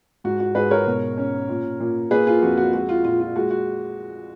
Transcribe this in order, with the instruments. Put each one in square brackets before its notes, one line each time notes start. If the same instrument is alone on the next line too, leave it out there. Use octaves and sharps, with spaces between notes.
[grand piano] G#2 F#4
F#4
G#2 G#4 B4
A#4 C#5
B2
C#4
A#2
A#2
A#3 G#4 B4
F4 G#4
F2 F#4
F#4
G#3 F#4
F4
A#2 F4
F4
G#3 F#4
F#4